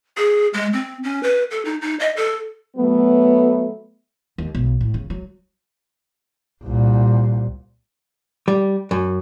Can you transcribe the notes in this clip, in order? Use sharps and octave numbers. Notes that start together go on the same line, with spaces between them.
G#4
G#3
C4
C#4
B4
A4
D#4
D#4
D#5
A4
F#3 A3 B3
D#2
B1
A2
C#3
F#3
C2 A#2
G3
F#2